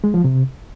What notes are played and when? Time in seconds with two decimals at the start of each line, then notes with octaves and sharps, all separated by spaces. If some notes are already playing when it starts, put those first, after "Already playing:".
0.04 G#3
0.14 F3
0.24 C3